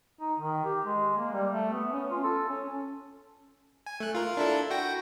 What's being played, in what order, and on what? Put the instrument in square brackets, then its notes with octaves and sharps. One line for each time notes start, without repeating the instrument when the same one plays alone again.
[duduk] D#4
D#3
G4
G#3
A#3
G3
A3
B3
C#4
F4
A4
C#4
[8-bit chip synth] G#5
A3 F#6
F4 A#4
D4 E4 A4
F#4 G5 A#6